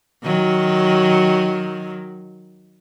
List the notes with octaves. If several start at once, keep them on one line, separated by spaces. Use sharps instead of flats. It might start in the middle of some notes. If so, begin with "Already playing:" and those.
D#3 F#3